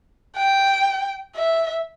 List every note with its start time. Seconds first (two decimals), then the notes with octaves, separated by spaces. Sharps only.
0.36 G5
1.36 E5